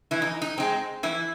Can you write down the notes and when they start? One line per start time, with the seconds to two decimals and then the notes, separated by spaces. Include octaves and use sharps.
0.11 E3 E4
0.22 D#4
0.42 D#4
0.58 G#3 C4 D#4
1.03 E3 E4